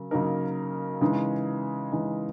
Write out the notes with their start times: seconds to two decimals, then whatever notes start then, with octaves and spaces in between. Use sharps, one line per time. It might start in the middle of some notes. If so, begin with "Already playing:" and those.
Already playing: C#3 F#3 A#4
0.11 C#3 F#3 A#3 D#4 A#4
1.01 C#3 E3 G#3 D#4
1.92 C#3 E3 G#3 D#4